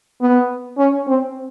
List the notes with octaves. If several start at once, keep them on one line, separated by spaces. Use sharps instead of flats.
B3
C#4
C4